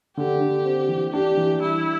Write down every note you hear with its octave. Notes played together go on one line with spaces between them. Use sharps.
D3 G4
D3
C4
E3
D4 G4
E3
G3 E4